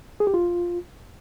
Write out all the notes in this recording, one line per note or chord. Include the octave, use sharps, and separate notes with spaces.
G#4
G4
F4